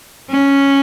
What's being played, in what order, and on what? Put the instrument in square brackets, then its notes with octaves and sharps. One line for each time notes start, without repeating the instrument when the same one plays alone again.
[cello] C#4